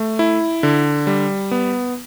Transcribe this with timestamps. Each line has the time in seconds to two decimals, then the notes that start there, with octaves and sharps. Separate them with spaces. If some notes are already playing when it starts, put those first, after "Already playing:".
Already playing: A3
0.19 E4
0.63 D3
1.07 G3
1.51 B3